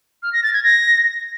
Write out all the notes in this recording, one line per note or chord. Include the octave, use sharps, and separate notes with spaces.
F6
A#6
A6
G#6
A#6